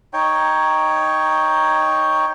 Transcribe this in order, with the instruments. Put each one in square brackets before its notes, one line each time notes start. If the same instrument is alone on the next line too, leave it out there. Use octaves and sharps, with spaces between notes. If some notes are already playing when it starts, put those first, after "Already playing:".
[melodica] D#4 C#5 G5